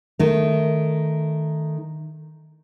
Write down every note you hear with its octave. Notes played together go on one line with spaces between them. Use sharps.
D#3 A3